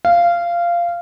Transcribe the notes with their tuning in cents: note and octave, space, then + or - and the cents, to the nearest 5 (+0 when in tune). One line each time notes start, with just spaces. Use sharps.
F5 -15